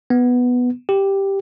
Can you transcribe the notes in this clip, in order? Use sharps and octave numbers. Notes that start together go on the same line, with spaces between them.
B3
G4